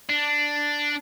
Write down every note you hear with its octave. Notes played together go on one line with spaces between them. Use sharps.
D4